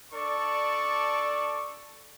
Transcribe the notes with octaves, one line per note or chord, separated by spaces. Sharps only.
D4 A4 D5 C#6